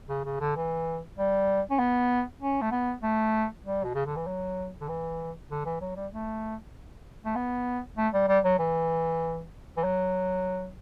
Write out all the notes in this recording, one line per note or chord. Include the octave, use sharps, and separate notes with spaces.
C#3
C#3
D3
E3
G3
C#4
B3
C#4
A3
B3
A3
G3
B2
C#3
D3
E3
F#3
D3
E3
D3
E3
F#3
G3
A3
A3
B3
A3
G3
G3
F#3
E3
E3
F#3